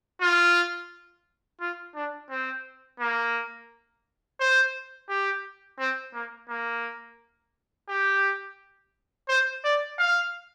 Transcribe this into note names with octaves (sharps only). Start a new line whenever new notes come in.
F4
F4
D4
C4
A#3
C5
G4
C4
A#3
A#3
G4
C5
D5
F5